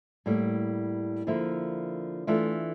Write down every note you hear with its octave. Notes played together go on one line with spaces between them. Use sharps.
A2 G3 A#3
D3 F3 A#3 E4
E3 A3 D4 F4